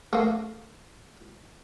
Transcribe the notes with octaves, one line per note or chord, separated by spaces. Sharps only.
A3 A#3